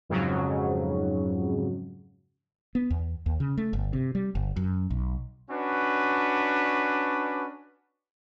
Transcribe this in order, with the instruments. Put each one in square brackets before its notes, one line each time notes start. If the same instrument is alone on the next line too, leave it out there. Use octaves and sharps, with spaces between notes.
[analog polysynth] F2 G#2 C#3 F#3
[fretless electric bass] B3
E2
D#2
C#3
A3
G1
C3
G3
G1
F#2
B1
[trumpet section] C#4 D4 F#4 B4